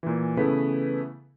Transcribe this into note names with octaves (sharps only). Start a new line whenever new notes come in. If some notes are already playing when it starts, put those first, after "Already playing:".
A#2 E3
C#3 E3 A3 B3 E4 B4